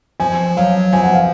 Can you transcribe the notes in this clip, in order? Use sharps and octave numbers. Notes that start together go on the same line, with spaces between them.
F3 G#5
F#3 F5
F3 G#5
F#5
F5